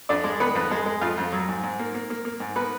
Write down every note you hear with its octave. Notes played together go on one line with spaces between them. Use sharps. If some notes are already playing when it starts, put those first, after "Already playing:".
F2 D4 D5
G#3
D#3 B3 B4
F2
G#3
G#3
F2 F4 F5
F2
F#3
G#2
G#2
A#3
A#3
A#3
A#3
G#2
A#3 B3 B4